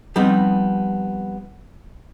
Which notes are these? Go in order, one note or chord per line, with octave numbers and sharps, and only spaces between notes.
F3 G3 B3 C4 D#4